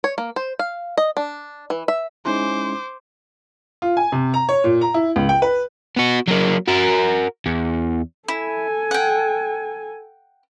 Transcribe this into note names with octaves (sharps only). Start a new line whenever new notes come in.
C#5
A#3
C5
F5
D#5
D4
E3
E5
G#3 C#4 D#4 E4 C5 G#5 C6 D6
F4
G#5
C3
A#5
C#5
A#2
A#5
E4
C#2
G5
B4
B3 F#4
F#3 A#3
F#4 A#4
E2
E4 A4 G#5
F#5 G5